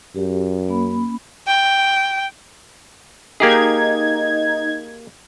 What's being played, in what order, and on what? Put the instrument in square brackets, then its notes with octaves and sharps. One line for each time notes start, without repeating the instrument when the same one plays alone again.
[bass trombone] F#2 [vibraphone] G4
[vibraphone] A#3 C#4 B5
[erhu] G5
[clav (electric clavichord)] A#3 G4 G#4 [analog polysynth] D#4 G#6